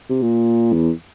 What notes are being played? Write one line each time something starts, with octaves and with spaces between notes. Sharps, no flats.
C3
A#2
E2